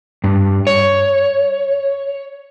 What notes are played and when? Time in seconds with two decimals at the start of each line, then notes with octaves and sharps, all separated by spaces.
0.24 G2
0.67 C#5